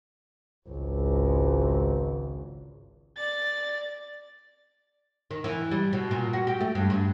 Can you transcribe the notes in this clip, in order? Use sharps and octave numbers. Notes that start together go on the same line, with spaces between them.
G#1 C#2
D5 A6
D#3
E3
G3
B2
A#2
F#4
G4
A3
G2
G2